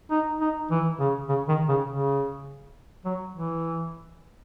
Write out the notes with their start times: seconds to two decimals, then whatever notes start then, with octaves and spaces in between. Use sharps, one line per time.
0.11 D#4
0.41 D#4
0.71 E3
0.99 C#3
1.29 C#3
1.48 D#3
1.69 C#3
1.88 C#3
3.05 F#3
3.35 E3